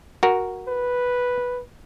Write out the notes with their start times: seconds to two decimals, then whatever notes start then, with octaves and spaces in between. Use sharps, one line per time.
0.23 F#4 A#4
0.68 B4